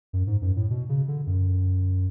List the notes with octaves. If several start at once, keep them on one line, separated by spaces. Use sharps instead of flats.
F#2
G#2
F#2
A2
B2
C#3
D3
F#2